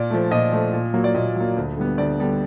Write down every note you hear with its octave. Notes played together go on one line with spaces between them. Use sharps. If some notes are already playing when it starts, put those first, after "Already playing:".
Already playing: A#2 D5
F3 A3
A#2 D#5
F3 A3
A#2
F#3 A#3
D5
A#2 D#5
F#3 A#3
D2
D3 G3 B3
D2 D5
D3 G3 B3